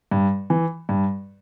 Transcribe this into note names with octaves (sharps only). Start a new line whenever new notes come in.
G2
E3
G2